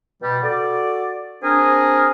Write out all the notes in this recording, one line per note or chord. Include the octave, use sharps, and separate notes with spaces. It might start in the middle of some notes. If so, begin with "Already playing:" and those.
B2 G3
F#4 A4 D5
C4 D4 G#4 A#4